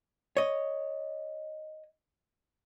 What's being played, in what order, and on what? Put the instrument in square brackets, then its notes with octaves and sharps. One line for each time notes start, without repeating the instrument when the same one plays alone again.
[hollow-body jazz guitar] C#5 D#5